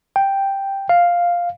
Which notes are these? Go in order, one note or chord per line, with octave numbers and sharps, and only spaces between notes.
G5
F5